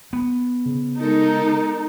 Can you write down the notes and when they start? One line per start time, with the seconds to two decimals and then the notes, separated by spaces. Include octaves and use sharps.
0.13 B3
0.66 C#3
0.99 G#3 D#4 A4 A#4